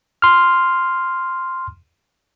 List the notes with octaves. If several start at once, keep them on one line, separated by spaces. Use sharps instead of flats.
C6 F6